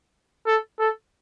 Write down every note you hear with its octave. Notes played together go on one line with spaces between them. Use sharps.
A4
A4